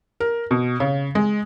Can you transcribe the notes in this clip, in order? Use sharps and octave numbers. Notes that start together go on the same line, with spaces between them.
A#4
B2
C#3
G#3